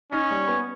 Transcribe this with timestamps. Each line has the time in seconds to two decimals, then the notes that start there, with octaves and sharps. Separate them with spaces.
0.12 C#4 D#4
0.31 G3
0.47 B3